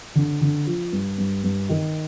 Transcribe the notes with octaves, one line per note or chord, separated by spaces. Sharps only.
D3
D3
F3
G2
G2
G2
D#3